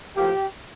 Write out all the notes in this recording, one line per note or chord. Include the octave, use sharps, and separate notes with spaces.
A2 F3 A#3 G4